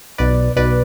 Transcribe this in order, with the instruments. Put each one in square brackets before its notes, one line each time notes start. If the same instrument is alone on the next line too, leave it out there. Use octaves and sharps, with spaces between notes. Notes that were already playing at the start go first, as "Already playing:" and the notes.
[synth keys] B1 B2 B4 D5
B1 B2 B4 D5